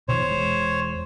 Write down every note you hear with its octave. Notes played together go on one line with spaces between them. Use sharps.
B2 D#3 F3 C5 C#5
E1 E3 G#3